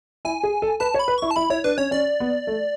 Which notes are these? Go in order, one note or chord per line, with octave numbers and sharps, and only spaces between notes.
E4 G#5
G#4
A4
B4 A5
C#5
B5
B4
E4 C#6
A5
E4 B5
E4 C#5
D4 B4
C#4 C#5
C#4 D5
B3
A3